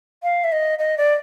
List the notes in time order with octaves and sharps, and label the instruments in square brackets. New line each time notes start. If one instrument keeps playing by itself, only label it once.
[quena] F5
E5
D#5
D#5
D5